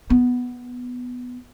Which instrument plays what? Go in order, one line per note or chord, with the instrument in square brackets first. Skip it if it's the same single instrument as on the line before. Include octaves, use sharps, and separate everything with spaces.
[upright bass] B3